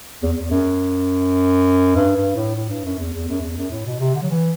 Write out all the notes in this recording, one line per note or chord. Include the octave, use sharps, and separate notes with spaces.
E2
E2
F#2
G2
G2
A2
A2
G2
F#2
E2
E2
F#2
E2
F#2
A2
B2
C3
D3
F#3
E3